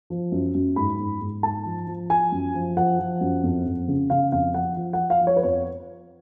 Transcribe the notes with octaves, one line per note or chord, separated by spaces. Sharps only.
F3
F#2
F#2
G#2 B5
G#2
G#2
G#2 A5
F3
F3
F3 G#5
F#2
F3
F3 F#5
F3
F#2
F2
F2
C#3
C#3 F5
F2 F5
F3 F#5
F3
F#5
F3
F5
F3
C#5
B4
F2 C#5